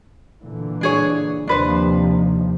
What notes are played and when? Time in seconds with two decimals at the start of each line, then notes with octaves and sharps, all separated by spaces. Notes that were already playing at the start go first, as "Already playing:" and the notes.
0.41 A#2 D3 E3
0.81 D4 G#4 C#5
1.48 D#2 C3 F3 D4 B4 C5